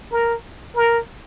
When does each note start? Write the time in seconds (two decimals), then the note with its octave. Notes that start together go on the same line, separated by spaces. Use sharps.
0.11 A#4
0.75 A#4